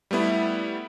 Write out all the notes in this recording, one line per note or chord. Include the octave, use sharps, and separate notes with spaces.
G3 A3 B3 E4